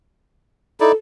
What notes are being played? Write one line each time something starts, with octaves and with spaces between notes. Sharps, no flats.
D#4 E4 A4 D5